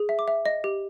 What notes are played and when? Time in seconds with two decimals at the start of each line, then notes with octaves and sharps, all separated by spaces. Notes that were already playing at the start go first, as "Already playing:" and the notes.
Already playing: G#4
0.09 E5
0.19 D6
0.28 E5
0.46 D#5
0.64 G4